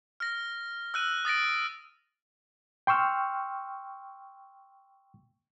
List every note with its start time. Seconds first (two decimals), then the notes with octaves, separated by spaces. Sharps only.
0.20 F6 A#6
0.94 E6 F#6 D#7
1.25 D#6 A6 A#6 D7
2.87 G5 C6 C#6 E6 F6